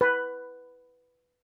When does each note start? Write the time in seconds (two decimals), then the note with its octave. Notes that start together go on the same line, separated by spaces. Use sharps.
0.01 B4